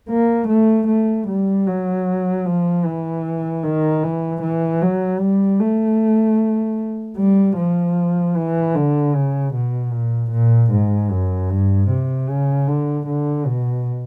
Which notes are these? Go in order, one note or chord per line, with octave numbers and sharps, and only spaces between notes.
A#3
A3
A3
G3
F#3
F3
E3
D#3
E3
E3
F#3
G3
A3
G3
F3
E3
D3
C#3
B2
A#2
A#2
G#2
F#2
G2
C3
C#3
D3
D3
B2